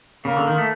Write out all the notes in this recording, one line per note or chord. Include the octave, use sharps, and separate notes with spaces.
C#3 A#3
D3
D#3
A3